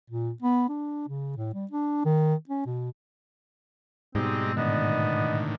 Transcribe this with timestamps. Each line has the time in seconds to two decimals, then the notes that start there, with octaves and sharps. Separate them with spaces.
0.10 A#2
0.42 B3
0.69 D4
1.09 C#3
1.37 A2
1.54 G3
1.71 D4
2.05 D#3
2.49 C#4
2.66 B2
4.15 G#2 B2 G3 G#3 C4 D#4
4.57 A2 D3 D#3 B3 D5 D#5